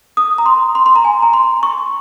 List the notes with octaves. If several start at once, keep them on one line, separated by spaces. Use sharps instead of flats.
D#6
A#5
C6
C6
C6
A#5
G#5
A#5
C6
C#6